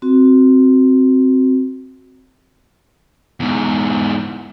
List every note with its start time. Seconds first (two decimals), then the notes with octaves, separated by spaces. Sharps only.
0.02 C4 F#4
3.40 E2 G#2